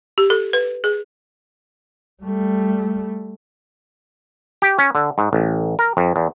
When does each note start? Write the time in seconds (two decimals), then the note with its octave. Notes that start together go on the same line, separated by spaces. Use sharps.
0.18 G4
0.30 A4
0.53 B4
0.84 G#4
2.23 G3 A3
4.62 G4
4.79 C#4
4.95 D3
5.18 G#2
5.33 A1
5.79 A#4
5.97 F2
6.16 E2